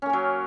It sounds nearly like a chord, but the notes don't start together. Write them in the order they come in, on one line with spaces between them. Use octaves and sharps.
C#4 A#3 A#4 F#3